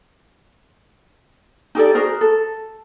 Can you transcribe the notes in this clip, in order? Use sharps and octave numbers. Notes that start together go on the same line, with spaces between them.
D#4 G4 A4 D5
F#4 G#4 A#4 C5
A4